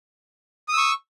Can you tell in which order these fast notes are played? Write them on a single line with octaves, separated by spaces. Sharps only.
D#6 E6 C#6